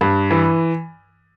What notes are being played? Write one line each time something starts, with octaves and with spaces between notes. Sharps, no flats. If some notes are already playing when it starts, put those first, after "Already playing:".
G2
E3